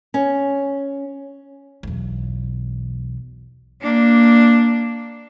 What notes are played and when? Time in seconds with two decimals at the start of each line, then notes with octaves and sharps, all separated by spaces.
0.14 C#4
1.83 B1 E2
3.82 A#3 D4